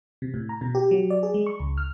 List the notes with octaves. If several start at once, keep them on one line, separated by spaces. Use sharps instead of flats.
C3
A2
A#5
B2
G4
F#3
D5
G#4
G#3
C#6
C#2
F6